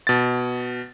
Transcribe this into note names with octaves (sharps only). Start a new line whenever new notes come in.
B2 A6